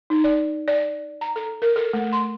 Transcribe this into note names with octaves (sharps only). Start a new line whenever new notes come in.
D#4
D5
D5
A#5
A4
A#4
A4
A3
C6